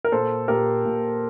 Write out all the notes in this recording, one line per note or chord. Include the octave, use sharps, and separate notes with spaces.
A#4
A#2 A4 C5
A#2 G4 A#4
A#2